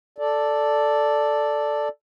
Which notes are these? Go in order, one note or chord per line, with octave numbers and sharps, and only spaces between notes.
A4 D5